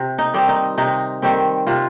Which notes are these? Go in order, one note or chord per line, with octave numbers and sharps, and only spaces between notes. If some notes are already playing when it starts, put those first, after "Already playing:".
Already playing: C3
D#4
D#3 G3 C4
D#4
C3 D#4
D#3 G3 C4
C3 F4